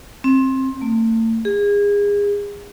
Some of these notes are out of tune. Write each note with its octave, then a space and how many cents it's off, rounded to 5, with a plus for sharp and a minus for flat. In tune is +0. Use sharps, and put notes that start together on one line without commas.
C4 +20
A3 +40
G#4 -30